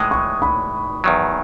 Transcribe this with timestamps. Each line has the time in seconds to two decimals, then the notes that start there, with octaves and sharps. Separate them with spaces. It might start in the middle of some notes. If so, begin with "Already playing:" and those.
Already playing: A2 E3 G#3 D#6
0.11 C#6
0.42 B5
1.04 E2 D#3 F#3